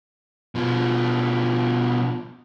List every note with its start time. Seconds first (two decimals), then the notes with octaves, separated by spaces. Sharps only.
0.55 B2 F3